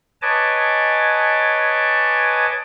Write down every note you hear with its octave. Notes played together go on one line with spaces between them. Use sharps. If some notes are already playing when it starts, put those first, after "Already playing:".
B4 C#5 D#5 G#5 A5 D6